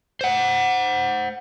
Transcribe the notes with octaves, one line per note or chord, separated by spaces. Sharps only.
C5 F#5